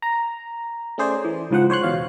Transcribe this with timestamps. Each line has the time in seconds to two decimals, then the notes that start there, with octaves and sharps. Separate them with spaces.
0.02 A#5
0.98 A3 C#4 G#4 C5 D5
1.24 E3
1.51 C#2 G#2 F3 C5 F#5
1.70 C5 C#5 C6 F#6
1.83 E2 B2 F5